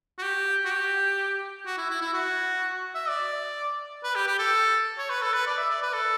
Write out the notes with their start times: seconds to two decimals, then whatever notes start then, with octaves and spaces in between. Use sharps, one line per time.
0.18 F#4
0.23 G4
0.65 F#4
0.70 G4
1.66 F#4
1.77 E4
1.90 E4
2.01 E4
2.13 F#4
2.95 E5
3.08 D5
4.04 B4
4.15 G4
4.27 G4
4.39 A4
4.98 C#5
5.10 B4
5.22 A4
5.34 B4
5.46 D5
5.58 E5
5.70 D5
5.82 B4
5.93 A4